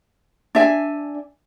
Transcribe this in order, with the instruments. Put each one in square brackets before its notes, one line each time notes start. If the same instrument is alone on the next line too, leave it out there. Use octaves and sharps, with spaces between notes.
[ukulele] D4 E5 G#5